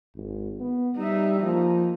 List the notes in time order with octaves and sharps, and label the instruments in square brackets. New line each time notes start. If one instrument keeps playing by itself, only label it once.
[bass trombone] G#1
B3
[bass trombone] G3 [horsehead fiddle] D#4 E5
[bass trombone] F3 [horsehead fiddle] A#3 D#4